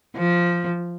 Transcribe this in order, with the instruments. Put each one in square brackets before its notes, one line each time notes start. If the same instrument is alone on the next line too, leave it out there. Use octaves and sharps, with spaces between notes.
[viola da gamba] F3